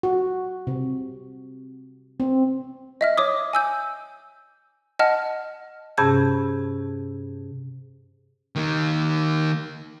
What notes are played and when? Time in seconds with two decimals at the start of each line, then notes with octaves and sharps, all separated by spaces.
0.03 F#4
0.67 C3
2.20 C4
3.01 D#5 E5 F6
3.17 C#5 D6 D#6
3.53 G#5 E6 G6
4.99 D#5 F#5 A5 F6
5.98 G2 C3 C#4 G#4 A5 G6
8.56 D#3 A#3